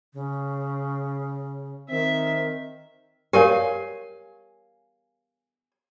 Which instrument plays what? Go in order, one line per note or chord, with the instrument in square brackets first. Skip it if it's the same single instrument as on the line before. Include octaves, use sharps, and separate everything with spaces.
[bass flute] C#3
[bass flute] D#3 [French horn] C4 [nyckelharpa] E5
[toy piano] G4 A#4 C#5 [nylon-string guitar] F5 G#5